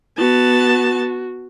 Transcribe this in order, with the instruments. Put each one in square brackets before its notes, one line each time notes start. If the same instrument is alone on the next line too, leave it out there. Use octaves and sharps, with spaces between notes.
[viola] B3 A5 [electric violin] F#4